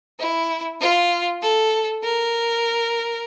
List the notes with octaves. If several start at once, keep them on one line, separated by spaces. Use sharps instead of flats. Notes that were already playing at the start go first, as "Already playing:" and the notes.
E4
F4
A4
A#4